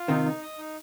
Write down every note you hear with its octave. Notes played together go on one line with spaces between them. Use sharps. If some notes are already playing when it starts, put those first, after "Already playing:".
Already playing: F4
C3 D#3 D#4
D#4
D#5
D#4